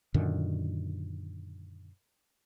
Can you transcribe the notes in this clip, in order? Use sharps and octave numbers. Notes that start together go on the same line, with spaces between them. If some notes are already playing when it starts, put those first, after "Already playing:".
F#2 A#2 D3 D#3